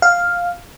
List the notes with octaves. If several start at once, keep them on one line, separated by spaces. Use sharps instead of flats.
F5